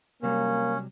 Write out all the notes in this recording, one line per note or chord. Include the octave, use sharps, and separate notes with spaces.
C3 F#3 G3 A#3 C#4